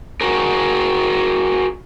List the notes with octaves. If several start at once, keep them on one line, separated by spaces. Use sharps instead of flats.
F#4 G#4 A#4